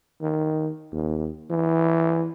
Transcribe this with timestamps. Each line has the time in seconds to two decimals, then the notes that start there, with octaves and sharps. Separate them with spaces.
0.21 D#3
0.93 D#2
1.51 E3